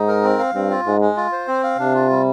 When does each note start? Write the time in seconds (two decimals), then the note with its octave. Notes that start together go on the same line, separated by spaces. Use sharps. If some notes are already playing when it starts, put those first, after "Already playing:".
Already playing: G#2 D#4
0.08 A#4
0.23 C4
0.39 F5
0.54 G2 C4
0.70 F4
0.86 G#2 G#3
1.01 G#3
1.17 F4
1.32 C5
1.48 C4
1.64 F5
1.78 C3 D4
1.95 F4
2.10 G3